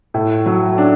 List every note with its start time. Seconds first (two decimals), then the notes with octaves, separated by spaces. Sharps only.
0.14 A2
0.46 F#3
0.78 D4